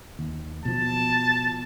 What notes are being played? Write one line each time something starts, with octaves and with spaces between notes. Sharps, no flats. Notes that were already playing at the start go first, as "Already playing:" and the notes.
D#2
B2 F3 A5